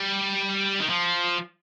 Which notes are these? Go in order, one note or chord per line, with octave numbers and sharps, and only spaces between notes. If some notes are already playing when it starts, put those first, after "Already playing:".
Already playing: G3
D#3
F3